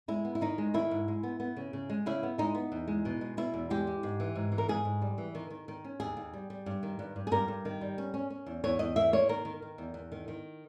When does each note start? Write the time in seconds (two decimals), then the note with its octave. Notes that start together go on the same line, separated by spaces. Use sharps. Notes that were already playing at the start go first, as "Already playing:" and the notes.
0.08 G#3 E4
0.25 B3
0.35 E4
0.41 D#3 D#4
0.58 G#3
0.74 D#3 E4
0.91 G#2
1.08 G#3
1.23 B3
1.40 B3
1.56 C#3
1.73 C#3
1.90 G#3
2.06 C#3 E4
2.23 B3
2.38 G#3 D#4
2.55 B3
2.72 E2
2.88 G#3
3.05 B2
3.21 G#3
3.37 B2 E4
3.54 E2
3.70 G#3 G4
3.87 G#3
4.03 G#2
4.20 E3
4.35 G#2
4.52 E3
4.58 A#4
4.69 G#2 G#4
4.85 G#2
5.02 G3
5.18 E3
5.35 D#3
5.50 D#3
5.68 D#3
5.84 C#4
6.00 D#2 G#4
6.17 D#2
6.33 G3
6.50 G3
6.66 G2
6.83 D#3
6.99 G2
7.16 G2
7.27 G#4
7.32 G2 A#4
7.48 G2
7.65 D#3
7.81 G3
7.98 C#4
8.14 C#4
8.30 C#4
8.46 E2
8.64 E2 C#5
8.79 E2 D#5
8.96 A#3 E5
9.13 A#3 C#5
9.29 D#3 A#4
9.45 D#3
9.62 D#3
9.78 E2
9.94 E2
10.12 D#3
10.28 D#3